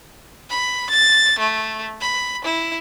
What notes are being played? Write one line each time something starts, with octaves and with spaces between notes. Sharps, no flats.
B5
A6
A3
B5
E4